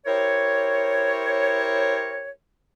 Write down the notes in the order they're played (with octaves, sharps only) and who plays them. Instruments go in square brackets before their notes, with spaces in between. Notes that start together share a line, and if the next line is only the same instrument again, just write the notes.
[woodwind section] E4 G4 A#4 C5 C#5